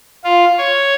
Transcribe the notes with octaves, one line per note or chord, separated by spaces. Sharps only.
F4
C#5